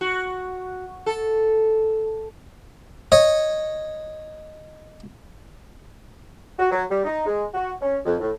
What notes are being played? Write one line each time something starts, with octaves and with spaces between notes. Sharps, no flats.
F#4
A4
C#5 D#5
F#4
F#3
G3
D#4
G#3
F#4
C#4
F2
A2